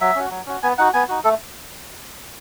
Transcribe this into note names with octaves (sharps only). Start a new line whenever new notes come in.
F#3 E5
C#4 F#4
F#3
C#4 F#4
B3 G#5
D#4 F#4 F#5
B3 G#5
D#4 F#4
A3 A4